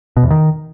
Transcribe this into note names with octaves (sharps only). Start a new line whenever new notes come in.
B2
E2
D#3